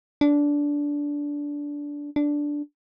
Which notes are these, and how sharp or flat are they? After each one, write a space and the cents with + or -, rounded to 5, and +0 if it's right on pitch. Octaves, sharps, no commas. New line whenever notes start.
D4 -15
D4 -5